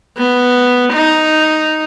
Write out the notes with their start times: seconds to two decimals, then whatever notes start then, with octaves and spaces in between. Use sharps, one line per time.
0.17 B3
0.93 D#4